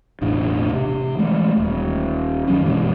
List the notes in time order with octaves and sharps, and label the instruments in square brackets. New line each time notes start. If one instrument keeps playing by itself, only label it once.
[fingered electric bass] E1 A1 A2 D4
C3
E3 G#3 A3
D#1
F#2 D#3 F#3 C#4
G1 B2 E3 G#3